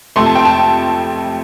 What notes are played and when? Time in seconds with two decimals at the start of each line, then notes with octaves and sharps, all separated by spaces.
0.16 F2 C3 A3 C6
0.26 A5
0.35 G5
0.45 A5